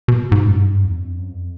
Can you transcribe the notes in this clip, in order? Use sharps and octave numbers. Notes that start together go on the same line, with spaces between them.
B2
G#2
F#2
G2
E2
F2
F#2
F2